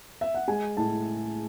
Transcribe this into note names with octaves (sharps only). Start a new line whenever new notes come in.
E5
F#5
G#3 G#5
A2 A5